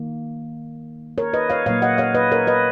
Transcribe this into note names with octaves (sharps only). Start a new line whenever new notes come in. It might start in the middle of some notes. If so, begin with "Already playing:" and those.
Already playing: D#3 A#3
A#4 C#5
B4 D#5
C#5 F5
A#2 F#3 A#3 C#5 F5
D#5 F#5
C#5 F5
B4 D#5
A#4 C#5
B4 D#5